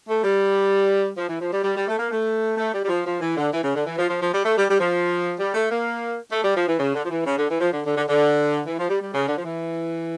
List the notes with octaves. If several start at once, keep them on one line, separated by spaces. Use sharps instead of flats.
A3
G3
F3
E3
F3
G3
G3
G3
A3
A#3
A3
A3
G3
G3
F3
F3
E3
D3
E3
C#3
D3
E3
F3
F3
F3
G3
A3
G3
G3
F3
G3
A3
A#3
A3
G3
F3
E3
C#3
D3
F3
E3
C#3
D3
E3
F3
D3
D3
D3
D3
E3
F3
G3
G3
C#3
D3
F3
E3